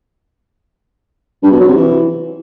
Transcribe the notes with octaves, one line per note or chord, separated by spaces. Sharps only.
G2
B2
F#3
C3
E3